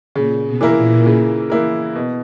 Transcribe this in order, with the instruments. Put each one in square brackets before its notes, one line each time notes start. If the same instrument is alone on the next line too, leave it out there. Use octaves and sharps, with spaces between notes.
[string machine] A#2 [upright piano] C#3
[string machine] B2
[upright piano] E3 A#3 E4 A#4
[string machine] A#2
[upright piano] C#3
E3 A#3 E4 A#4
B2